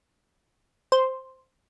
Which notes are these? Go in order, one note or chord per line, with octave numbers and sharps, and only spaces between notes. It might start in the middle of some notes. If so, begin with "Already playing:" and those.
C5